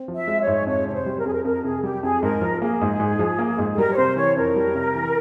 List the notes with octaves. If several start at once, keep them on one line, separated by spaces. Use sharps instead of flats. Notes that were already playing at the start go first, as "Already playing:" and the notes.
Already playing: C4
F3
E5
G#3
C#5
G#2
F2 C#5
C3 C#5
C5
G3
A#4
F2 G#4
A#4
F2 A#4
C3 G#4
G3 G4
F2 G#4
G#2 A#4
F3
A#3 G#4
G#2
G#2
F3
A#3
G#2
G#4
G3 A#4
C#5
C3 C5
E3 C#5
F2 A#4
G3
C3
E3